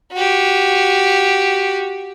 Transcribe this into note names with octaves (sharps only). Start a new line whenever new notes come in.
F#4 G4